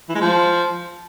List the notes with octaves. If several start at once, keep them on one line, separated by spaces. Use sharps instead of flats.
E3
G#3
F3